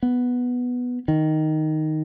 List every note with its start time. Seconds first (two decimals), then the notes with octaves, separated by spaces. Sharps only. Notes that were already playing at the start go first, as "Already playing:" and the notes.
0.03 B3
1.08 D#3